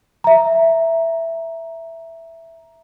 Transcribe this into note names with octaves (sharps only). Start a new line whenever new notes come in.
E5 A#5